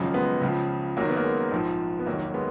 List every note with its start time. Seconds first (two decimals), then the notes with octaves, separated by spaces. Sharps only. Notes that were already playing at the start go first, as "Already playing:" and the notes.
Already playing: G#1 F#2 C#3 F3
0.14 G#3 B3
0.41 C#2 C#3 F3
0.97 F#1 F#2 D#3 F#3 A#3
1.09 B3
1.17 A#3
1.24 G#3
1.52 A#1 G#2 F3
1.99 B3
2.06 F1 D#2 D#3 F#3 A#3
2.34 G#3 B3